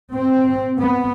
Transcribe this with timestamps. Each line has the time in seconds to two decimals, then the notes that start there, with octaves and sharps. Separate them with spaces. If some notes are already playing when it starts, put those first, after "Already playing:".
0.13 C4
0.79 B3